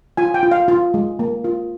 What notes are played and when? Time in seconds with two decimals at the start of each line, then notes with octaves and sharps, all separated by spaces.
0.17 F4 G#5
0.34 G5
0.43 F4
0.51 F5
0.68 F4
0.94 G#3
1.19 A#3
1.44 F4